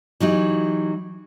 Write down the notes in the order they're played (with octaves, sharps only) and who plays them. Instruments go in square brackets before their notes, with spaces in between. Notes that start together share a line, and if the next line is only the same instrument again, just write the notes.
[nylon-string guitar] E3 F#3 D#4 G4